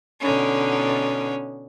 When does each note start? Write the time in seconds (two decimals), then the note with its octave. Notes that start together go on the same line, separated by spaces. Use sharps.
0.21 B2 D3 C#4 D#4